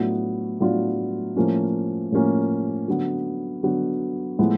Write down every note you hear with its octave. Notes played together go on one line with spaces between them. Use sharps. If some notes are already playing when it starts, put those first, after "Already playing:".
Already playing: A2 F#3 B3 D4 F4
A2 F#3 B3 D4 F4
A2 F3 A#3 C#4
A2 F3 A#3 C#4
D3 F#3 B3
D3 F#3 B3
A2 F3 G#3 B3 E4